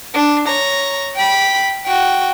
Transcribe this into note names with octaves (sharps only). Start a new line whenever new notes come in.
D4
C#5 A#5
G5 B5
F#4 G5